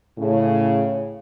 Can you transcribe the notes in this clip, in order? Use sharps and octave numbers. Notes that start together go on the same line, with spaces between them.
A2 C#3